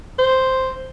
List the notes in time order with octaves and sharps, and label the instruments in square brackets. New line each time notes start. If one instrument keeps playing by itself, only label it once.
[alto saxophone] C5